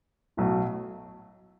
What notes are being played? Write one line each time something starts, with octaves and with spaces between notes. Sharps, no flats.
B1 A2 F#3 A3